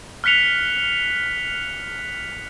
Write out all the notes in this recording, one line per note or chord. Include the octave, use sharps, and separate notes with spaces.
F6 F#6 B6 C#7 F7